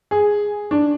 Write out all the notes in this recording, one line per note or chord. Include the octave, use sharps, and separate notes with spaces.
G#4
D4